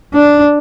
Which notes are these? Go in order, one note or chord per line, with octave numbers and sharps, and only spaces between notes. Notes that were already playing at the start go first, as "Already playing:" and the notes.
D4